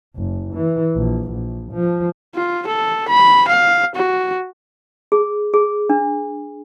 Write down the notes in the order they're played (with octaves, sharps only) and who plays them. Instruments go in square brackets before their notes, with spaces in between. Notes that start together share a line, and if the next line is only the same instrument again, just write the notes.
[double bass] F#1
E3
A#1
A#1
F3
[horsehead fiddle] F4
A4
B5
F5
F#4
[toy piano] G#4
G#4
D4